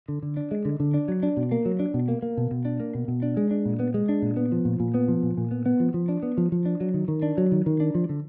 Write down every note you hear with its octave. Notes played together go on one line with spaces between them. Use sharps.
D3
D3
D4
G#3
D3
D3
D4
F#3
D4
B2
A#3
F#3
D4
B2
A#3
A#3
B2
B2
D4
A#3
B2
B2
D4
G#3
D4
A#2
B3
G#3
D4
A#2
B3
F3
A#2
A#2
B3
F3
A#2
A#2
B3
B3
F3
F3
D4
B3
F3
F3
D4
F#3
D#3
D#3
D4
F#3
D#3
D#3
D4
F3
D3